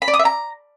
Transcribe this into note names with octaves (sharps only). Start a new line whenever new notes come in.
B5
D5
D#6
E5
A#5